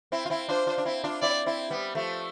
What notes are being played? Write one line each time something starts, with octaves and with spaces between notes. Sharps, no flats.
C4 E4
F4
C4 E4
D4 F4 C5
D4 F4
D4
C4 E4
D4 F4
C4 E4 D5
C4 E4
G3 B3
F3 A3